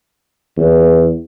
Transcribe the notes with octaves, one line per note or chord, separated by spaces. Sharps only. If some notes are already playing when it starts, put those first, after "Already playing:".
E2